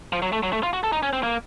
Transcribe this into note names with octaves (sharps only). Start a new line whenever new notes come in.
F3
F#3
A3
F#3
A3
F4
F#4
A4
D#4
C#4
C4
A#3